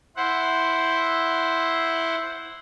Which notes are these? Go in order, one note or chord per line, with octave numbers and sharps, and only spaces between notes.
E4 C5 F#5